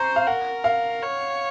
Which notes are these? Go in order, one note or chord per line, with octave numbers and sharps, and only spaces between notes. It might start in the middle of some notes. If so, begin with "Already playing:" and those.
Already playing: C5 A#5 C6 C#6
F5
A#4 F#5
F5
C#5